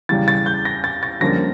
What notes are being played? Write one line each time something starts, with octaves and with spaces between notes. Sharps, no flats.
E2 C#3 G3 A6
A6
G6
A#6
A6
A6
F2 D3 G3 A#3 C#4 A#6